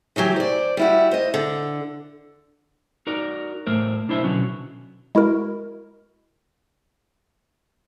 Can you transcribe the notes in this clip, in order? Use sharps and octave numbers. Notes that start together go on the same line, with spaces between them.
C#3 E3 F#3 G4
C5 D5
G3 E4 F#4
C5 D#5
D3
D#4 F#4 A#4 D5
A2 A3 A#4 C5
B1 D4 E4 C5 E5
B2 D3 F#3 B3 C#4
G#3 E4 F#4 A#4